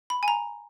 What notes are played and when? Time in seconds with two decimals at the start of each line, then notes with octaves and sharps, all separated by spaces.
0.10 B5
0.23 G#5
0.28 A#5